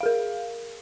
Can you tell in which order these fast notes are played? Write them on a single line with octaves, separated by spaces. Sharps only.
F5 G#4 A#4